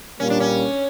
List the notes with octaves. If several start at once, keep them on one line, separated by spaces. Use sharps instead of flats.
A#2 G3 A#3 C#4
D4
C#4